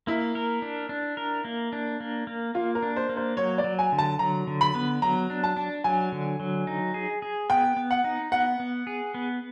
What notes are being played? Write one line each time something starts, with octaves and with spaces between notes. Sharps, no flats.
A#3 E4
A#4
D4
D4
A#4
A#3
D4
A#3
A#3
A#3 F4
A#4
D4
C5
A#3
C5
F#3 C#5
D5
F#3
G#5
D3
A5
F#3 A#5
D3
B5
B3
F#3 A#5
D4
A5
D4
F#3 G#5
D3
F#3
D#4
G#4
G#4
B3 G5
B3
F#5
D#4
B3 F#5
B3
G#4
B3